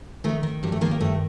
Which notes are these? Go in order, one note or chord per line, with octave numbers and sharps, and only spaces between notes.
D#3 A3
D#3
G2 G3
A3
D#3 A#3
A#3
G2 A3